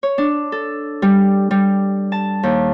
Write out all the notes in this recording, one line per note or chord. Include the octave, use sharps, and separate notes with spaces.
C#5
D4
A4
G3
G3
A5
D#2